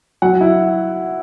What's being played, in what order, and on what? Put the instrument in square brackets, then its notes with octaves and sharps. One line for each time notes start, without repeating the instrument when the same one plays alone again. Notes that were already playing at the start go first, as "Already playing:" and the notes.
[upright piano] F#3 F#5
E4